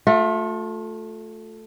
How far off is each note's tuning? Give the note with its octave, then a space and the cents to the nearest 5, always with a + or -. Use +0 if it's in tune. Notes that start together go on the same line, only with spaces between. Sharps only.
A3 +0 F4 +40